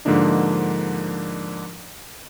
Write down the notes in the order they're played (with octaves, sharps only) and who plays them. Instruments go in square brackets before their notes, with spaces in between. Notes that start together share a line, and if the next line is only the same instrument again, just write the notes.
[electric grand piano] G#2 D3 F3 A#3 D4 D#4